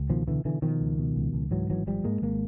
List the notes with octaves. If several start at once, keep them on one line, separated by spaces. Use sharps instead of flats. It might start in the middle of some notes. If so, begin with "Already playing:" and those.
Already playing: C#2
B2 D#3 F3
B2 D3 E3
B2 D3 E3
B2 D#3 F3
C#2
B2
C#2
C#2
G#2 E3 F#3
G#1 E3 F#3
G#1 F3 G3
G#2 G#3 A#3
G#1 G#3 A#3